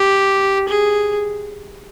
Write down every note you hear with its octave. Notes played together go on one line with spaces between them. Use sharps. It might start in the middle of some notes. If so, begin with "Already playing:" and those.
Already playing: G4
G#4